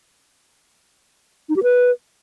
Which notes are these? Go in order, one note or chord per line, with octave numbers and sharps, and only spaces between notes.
D#4
G4
B4